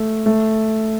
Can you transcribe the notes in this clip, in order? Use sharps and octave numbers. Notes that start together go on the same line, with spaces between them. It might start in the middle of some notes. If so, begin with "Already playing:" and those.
Already playing: A3
A3